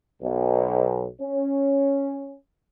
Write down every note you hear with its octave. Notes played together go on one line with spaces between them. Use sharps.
B1
C#4